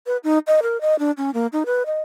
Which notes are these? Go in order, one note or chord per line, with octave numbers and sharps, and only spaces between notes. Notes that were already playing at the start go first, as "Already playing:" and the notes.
B4
D#4
D#5
A#4
D#5
D4
C#4
A#3
D#4
B4
D#5